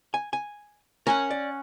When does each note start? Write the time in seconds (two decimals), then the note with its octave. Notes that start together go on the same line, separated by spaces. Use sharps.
0.14 G#5
0.33 G#5
1.07 C#4 A#4 F#5 G#5
1.30 D5